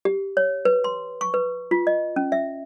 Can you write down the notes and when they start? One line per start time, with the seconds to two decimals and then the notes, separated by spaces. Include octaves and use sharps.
0.05 G4
0.37 C#5
0.65 B4
0.84 C6
1.21 C#6
1.34 B4
1.71 F4
1.87 D#5
2.16 C#4
2.32 E5